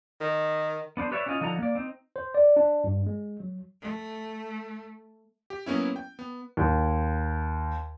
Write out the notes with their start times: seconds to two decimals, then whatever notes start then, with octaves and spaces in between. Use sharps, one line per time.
0.21 D#3
0.97 B3 D4 A#4 C5
1.11 G4 B4 C#5 D5 E5
1.26 C#4 E4 F4 D5 D#5 F5
1.41 D3 F3 D#4 A4 F#5 A#5
1.59 A#3 D5
1.75 C4 D#4
2.16 C5
2.34 D5
2.57 D4
2.84 G2
3.07 G#3
3.40 F#3
3.81 A3
5.50 G4
5.66 F#3 A#3 B3 C#4 E4
5.96 G5
6.19 B3
6.57 D#2